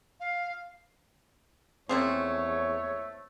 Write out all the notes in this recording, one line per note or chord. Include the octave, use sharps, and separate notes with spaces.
F5
E2 F3 A3 A#3 C4 C#4 G#4 C#5